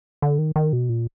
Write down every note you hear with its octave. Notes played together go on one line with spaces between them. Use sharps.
D3
D#3
D#3
B2
A#2